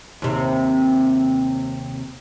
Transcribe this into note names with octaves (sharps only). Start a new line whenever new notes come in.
D#2 C3